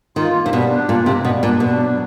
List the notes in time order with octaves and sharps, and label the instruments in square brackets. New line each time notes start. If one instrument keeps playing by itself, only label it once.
[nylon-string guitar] D#3 [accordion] F4
[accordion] A#3
[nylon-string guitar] C3
[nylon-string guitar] B2 [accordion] G3
[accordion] D4
[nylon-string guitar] A#2 [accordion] F4
[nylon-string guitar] C3 [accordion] A#3
[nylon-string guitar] B2 [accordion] G3
[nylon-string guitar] A#2 [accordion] D4
[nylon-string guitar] B2 [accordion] D4
[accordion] F#3